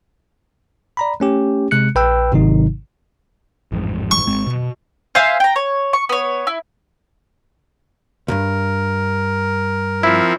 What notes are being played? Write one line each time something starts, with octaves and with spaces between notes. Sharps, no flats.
D5 A#5 B5
A3 C#4 G4
C3 G#3 F#6 C#7
A#1 B4 G5 E6
G#1 G#2 C3 D#3 F#3 D#4
A1 F2 G#2
C#6
G#1 G#3 C4
B2
C5 E5 F5 G#5
G5 A#5
C#5
C#6
B3 C#5
E4
C#2 G2 A#4
F3 C4 E4